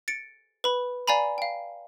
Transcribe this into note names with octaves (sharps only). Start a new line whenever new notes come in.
A6 C#7 D7
B4 B5
D5 F5 G#5 A#5 B5
F5 G5